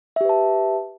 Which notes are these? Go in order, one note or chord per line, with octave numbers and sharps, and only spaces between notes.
G4 B4 E5 A5